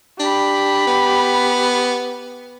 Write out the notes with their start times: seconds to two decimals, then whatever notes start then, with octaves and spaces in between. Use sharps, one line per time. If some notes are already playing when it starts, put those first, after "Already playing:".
0.20 D4 G4 B5
0.87 B3